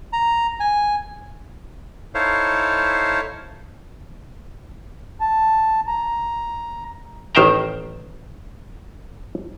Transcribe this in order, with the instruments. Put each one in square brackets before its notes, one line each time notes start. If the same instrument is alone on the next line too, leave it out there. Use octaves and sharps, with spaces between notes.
[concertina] A#5
G#5
D#4 E4 A4 C5 C#5 F5
[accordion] A5
A#5
[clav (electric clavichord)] A1 D#3 C5 E5 G5 A#5